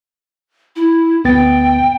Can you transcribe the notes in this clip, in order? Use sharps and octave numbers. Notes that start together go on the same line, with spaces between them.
E4
D2 B3 G5 A6